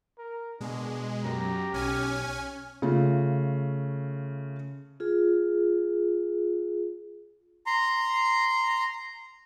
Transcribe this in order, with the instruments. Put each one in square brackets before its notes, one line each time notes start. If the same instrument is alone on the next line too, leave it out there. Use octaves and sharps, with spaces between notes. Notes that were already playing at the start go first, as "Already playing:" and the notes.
[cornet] A#4
[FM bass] B2 [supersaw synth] G#3 [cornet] D4
[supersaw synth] F#2 [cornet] G4 [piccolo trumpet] A#5
[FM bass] B1 [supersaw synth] C#4 G#5 [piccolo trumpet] F6
[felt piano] C#3 A3 F4
[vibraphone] F4 G#4
[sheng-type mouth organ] A#5 C6